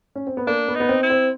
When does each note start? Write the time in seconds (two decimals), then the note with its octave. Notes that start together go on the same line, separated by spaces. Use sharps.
0.16 C#4
0.27 C4
0.37 B3
0.47 A#3 D4
0.68 B3
0.75 D#4
0.80 B3
0.89 C4
1.03 E4
1.10 C4